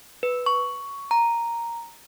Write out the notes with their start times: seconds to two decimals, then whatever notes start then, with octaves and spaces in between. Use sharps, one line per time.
0.23 B4
0.46 C#6
1.11 A#5